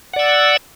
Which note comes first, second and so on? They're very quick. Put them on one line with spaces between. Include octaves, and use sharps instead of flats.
F#5 D5 E6